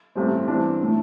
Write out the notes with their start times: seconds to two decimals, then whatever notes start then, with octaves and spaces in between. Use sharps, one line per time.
0.15 A1 G2 G3 C4
0.48 G2 E3 C4 D4
0.83 A2 A3